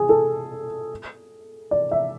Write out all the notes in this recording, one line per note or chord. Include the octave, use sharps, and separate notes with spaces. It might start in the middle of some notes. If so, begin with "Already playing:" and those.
Already playing: G#4
A4
D5
E5